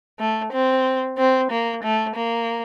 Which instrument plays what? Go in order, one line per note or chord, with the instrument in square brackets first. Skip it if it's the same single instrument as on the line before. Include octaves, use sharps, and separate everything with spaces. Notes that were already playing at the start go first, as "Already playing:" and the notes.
[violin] A3
C4
C4
A#3
A3
A#3